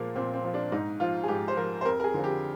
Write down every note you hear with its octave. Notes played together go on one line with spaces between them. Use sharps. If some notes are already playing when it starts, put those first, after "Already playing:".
Already playing: A#2 F3 G#3 A#3
A#2 C4
C4
F3
D4
G#2 D#4
F3 F4
G#4
G#2 G4
C5
F3 A#4
C5
F2 A#4
A#4
G#4
D3 F3
G4